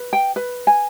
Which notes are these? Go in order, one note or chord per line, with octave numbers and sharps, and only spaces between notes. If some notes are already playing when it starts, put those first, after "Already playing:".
Already playing: B4
G5
B4
G#5